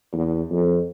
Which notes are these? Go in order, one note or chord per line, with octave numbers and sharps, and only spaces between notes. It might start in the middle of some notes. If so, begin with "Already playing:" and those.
E2
F2